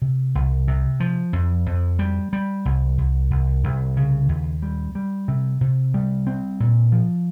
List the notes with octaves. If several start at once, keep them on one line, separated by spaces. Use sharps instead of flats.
C3
C2
C3
F3
F2
F2
G3
G3
C2
C2
C2
C2
C#3
D#2
G3
G3
C3
C3
G3
C4
A#2
F3